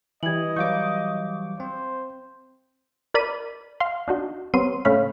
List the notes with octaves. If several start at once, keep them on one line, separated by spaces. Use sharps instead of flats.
E3 G3 D#5 G#6 F#7
E3 F#3 G3 F5 C#6 D6 G6
C4 C5
A#4 D5 B5 D#7
F5 C6
D4 D#4 F#4
G3 B3 C4 C#5 C6 D#7
A2 C#3 A3 C#5 F5 B5